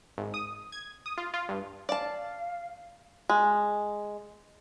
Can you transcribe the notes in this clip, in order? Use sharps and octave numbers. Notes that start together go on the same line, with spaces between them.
G#1
D#6
G#6
D#6
F4
F4
G2
D5 F5 A5
G#3